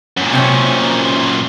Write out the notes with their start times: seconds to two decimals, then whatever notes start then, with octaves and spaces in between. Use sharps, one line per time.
0.17 F#2 A#2
0.33 C3 C4 C#4